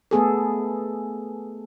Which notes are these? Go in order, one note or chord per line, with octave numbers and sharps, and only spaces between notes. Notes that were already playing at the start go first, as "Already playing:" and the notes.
A3 B3 G#4 A4